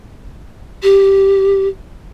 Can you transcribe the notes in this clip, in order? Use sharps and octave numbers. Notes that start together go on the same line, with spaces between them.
G4